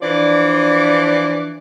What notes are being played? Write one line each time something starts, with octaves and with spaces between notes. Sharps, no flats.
E3 F3 D4 D5